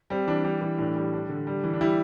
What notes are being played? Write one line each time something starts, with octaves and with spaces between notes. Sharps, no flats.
G3 C4
E3 D4
G3 D4
E3
A2 D4
G3
G3 D4
D3
G3
E3
D4
G3 E4